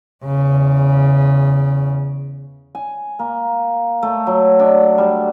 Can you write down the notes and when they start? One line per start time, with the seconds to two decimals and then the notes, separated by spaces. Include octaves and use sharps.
0.24 E2 C#3
2.75 G#5
3.19 A#3
4.03 A3
4.27 F#3
4.59 D4
4.98 G3